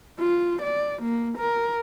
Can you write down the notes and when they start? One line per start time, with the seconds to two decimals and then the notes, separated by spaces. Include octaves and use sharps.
0.20 F4
0.63 D5
1.03 A#3
1.38 A#4